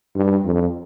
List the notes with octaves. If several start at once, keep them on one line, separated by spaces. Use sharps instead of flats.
G2
F2